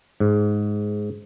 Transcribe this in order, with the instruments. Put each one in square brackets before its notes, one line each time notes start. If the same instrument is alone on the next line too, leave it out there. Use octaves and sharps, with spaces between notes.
[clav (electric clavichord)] G#2